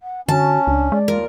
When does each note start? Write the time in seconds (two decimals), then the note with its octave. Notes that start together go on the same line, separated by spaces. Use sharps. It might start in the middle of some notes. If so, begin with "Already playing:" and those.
0.02 F#5
0.28 D3 C#4 F#4 A5
0.67 C#2 D4
0.92 G#3 D5
1.08 D#2 F4 A#4